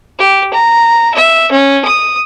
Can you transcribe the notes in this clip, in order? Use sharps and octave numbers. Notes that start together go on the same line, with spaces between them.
G4
A#5
E5
C#4
D#6